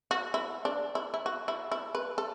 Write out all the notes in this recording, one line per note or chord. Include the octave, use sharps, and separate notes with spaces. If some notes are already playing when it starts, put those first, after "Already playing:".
F#4
E4
D4
E4
E4
F#4
E4
E4
B4
A4